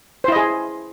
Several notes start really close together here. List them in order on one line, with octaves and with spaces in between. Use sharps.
C5 E4 D#5 G#4